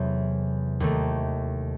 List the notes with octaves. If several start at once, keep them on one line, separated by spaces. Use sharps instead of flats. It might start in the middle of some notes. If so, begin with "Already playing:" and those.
Already playing: E2 C3 F#3 A3
D#2 D#3 A3